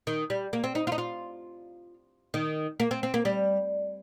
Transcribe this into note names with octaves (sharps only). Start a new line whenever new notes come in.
D#3
G3
A#3
C4
D#4
F4
D#4
F4
D#3
A#3
C4
C4
A#3
G3